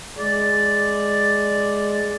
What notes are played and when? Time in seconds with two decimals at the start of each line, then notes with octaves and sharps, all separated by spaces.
0.19 G#3 D5